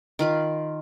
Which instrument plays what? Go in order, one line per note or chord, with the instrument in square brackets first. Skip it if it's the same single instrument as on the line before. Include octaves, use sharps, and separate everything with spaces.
[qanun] D#3 F4 B5